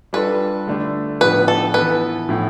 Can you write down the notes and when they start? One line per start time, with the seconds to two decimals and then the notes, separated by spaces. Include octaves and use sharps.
0.13 G3 D4 F4 A4 B4
0.68 D3 A3 D4
1.21 A2 F3 B3 D4 G4 B4
1.48 A4
1.74 E3 B3 E4 A4 B4
2.29 A2 F3 B3 E4